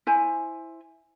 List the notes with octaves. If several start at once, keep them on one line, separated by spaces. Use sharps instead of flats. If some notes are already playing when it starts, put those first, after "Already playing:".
E4 C5 G#5